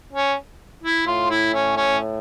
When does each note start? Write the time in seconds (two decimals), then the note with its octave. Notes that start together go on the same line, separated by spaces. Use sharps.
0.13 C#4
0.83 E4
1.07 A2 F4
1.30 E4
1.54 C#4
1.76 C#4